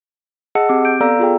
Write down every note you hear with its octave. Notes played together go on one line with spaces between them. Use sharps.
G#4 D#5 F#5 A5 E6 C#7
C4 G4 D6
G6 D7
B3 A4 D5 F5 A#5 E6
F4 G#4 G5